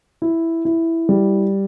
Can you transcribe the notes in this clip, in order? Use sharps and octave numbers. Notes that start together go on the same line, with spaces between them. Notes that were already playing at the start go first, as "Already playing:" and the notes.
E4
E4
G3